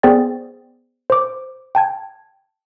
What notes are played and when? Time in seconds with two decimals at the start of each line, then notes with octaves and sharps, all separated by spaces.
0.03 B3 G#4 C5 D5 G5 A6
1.10 C5 D6
1.75 G5 A5 G#6